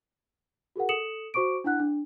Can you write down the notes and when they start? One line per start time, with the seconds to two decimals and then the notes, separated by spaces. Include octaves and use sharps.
0.76 F#4 G#4 A#4 F#5
0.89 A4 D#6 C#7 E7 F#7
1.34 F#4 C5 C#6 D6 D7
1.64 D4 E4 F#5 F#6
1.80 D4